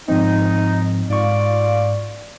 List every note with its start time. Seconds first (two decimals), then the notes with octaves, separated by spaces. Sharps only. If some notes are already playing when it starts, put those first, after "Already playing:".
0.08 G#2 F3 C4 D#4
1.10 G#2 F4 D5 C#6